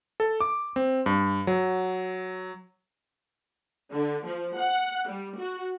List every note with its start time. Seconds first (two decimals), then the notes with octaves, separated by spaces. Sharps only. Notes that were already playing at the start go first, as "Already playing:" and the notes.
0.20 A4
0.41 D6
0.76 C4
1.06 G2
1.47 F#3
3.90 D3
4.25 F3
4.57 F#5
5.08 G3
5.37 F#4